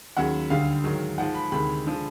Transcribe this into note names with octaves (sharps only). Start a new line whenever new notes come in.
D#2 C#3 F#3 F#5
D2 D3 G3 F5
G#2 D#3 F#3
G#2 F3 G#3 F#5
B5
D2 C3 D#3 G#3 B5
D3 F3 G#3